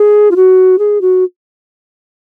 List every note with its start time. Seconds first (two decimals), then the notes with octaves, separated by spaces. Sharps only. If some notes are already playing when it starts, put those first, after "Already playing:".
Already playing: G#4
0.31 F4
0.36 F#4
0.79 G#4
1.01 F#4